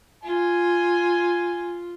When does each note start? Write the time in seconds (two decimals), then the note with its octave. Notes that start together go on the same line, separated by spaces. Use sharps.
0.24 F4 G#5